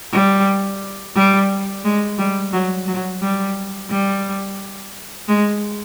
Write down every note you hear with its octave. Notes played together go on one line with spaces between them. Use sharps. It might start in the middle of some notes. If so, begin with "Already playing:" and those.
G3
G3
G#3
G3
F#3
F#3
G3
G3
G#3